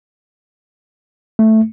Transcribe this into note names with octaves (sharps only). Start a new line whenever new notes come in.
A3